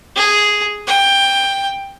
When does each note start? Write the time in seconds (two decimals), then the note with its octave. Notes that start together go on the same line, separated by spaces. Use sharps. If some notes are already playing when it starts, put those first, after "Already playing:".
0.16 G#4
0.87 G5